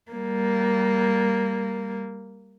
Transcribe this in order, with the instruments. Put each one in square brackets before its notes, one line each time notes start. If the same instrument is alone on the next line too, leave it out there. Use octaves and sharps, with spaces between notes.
[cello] G3 A#3